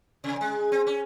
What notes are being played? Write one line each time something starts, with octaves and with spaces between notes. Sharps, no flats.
C3
G#3
C4
C#4